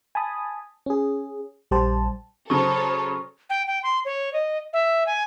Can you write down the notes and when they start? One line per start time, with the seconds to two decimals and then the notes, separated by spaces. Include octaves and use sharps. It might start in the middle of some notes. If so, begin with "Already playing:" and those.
0.15 G#5 A5 B5 D#6
0.86 C#4 G#4
1.71 A#1 G3 G4 C5 A5
2.50 C#3 F#3 A4 C5 C#5 C#6
3.50 G5
3.67 G5
3.83 C6
4.05 C#5
4.33 D#5
4.73 E5
5.07 G#5